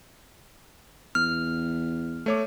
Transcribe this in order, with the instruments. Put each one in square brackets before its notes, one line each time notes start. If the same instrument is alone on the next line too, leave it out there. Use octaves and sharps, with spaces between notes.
[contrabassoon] E2 [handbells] F6
[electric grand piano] A3 C#5 D6